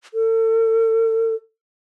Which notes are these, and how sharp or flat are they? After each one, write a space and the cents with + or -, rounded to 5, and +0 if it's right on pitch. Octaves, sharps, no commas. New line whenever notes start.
A4 +40